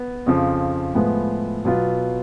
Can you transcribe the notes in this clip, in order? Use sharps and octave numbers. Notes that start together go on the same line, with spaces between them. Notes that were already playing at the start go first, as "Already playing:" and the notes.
Already playing: B3
F2 C#3 F3
A2 F3 G#3 B3
B2 F#3 B3 F4